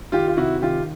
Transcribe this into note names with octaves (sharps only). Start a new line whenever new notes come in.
D#3 F4 G4
F4
C3 E4 F#4
D#3 F4 G4